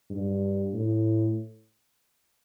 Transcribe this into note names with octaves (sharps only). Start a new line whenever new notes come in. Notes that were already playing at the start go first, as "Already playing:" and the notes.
G2
A2